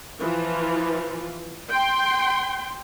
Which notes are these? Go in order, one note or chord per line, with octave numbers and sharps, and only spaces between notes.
E3 F3 F4
G5 C6